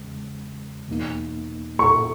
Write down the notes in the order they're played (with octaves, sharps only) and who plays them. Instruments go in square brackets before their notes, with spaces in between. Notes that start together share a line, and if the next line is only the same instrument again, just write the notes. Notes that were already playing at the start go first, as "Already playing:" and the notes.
Already playing: [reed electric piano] E2 C#3 G#3
E2 B2 A#3 D#4
[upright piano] C#6